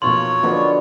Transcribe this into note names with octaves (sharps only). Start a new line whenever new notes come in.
F1 B2 F#3 A#3 F4 C#5 C6
B2 D3 F3 A#3 B3 D4